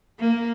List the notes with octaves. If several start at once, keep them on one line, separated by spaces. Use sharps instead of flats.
A#3